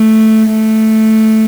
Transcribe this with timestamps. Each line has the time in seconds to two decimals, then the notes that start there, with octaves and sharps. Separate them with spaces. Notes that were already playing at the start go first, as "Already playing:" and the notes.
Already playing: A3
0.48 A3